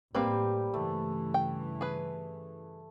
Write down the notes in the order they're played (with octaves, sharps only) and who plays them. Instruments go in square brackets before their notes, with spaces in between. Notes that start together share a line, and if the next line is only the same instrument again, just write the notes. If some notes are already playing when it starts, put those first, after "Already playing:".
[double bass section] A1 A2 [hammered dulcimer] G3 [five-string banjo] A#3 C4 B4
[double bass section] G2 C#3 E3 [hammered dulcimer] A3
[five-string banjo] G5
G#4 B4